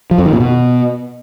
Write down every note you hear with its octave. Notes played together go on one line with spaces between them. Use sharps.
F3
F2
D#3
A#2
B2